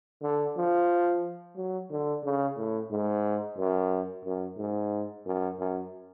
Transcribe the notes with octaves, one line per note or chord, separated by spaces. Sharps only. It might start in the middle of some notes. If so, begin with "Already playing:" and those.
D3
F3
F#3
D3
C#3
A2
G#2
F#2
F#2
G#2
F#2
F#2